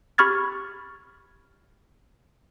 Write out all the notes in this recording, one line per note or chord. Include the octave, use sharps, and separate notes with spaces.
G4 B5 C#6 F6 G#6 A6